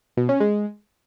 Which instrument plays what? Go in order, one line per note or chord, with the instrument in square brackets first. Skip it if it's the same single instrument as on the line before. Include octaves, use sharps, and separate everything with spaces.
[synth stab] B2
C#4
G#3